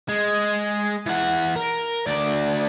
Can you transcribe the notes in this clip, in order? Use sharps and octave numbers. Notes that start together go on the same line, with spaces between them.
G#3
E3 F#5
A#4
D2 D5